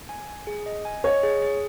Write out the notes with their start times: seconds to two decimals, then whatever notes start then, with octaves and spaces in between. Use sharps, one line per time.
0.09 G#5
0.28 G#5
0.47 G#4
0.66 D#5
0.85 G#5
1.04 C#5 D#5
1.23 G#4
1.42 G#4